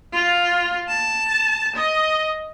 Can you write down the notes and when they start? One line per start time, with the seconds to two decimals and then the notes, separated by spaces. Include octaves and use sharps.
0.13 F4
0.88 A5
1.76 D#5